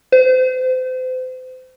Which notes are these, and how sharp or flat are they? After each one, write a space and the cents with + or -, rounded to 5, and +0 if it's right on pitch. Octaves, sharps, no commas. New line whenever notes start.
C5 -35